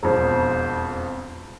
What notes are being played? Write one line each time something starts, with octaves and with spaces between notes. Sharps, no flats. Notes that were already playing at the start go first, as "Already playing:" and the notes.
E1 F2 C5